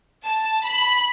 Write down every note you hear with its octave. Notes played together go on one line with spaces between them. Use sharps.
A5
B5